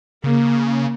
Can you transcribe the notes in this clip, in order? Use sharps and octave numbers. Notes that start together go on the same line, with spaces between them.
C#3 A#3